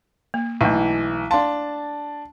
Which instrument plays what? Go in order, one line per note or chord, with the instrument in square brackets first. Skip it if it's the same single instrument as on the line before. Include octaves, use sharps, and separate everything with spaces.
[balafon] A#3
[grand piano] B1 E3 [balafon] A3 E4
[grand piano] D4 A5 [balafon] F5 C6